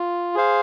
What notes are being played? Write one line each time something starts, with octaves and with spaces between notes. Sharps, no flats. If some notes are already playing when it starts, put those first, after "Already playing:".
Already playing: F4
G#4 C5 F5